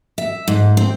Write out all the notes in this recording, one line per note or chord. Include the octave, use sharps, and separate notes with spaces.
E5
G#2
C4